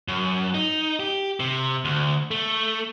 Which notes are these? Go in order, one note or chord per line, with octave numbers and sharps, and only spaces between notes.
F#2
D#4
G4
C3
D2
A3